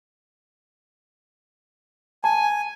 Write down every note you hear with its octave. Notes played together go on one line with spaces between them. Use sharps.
G#5 A5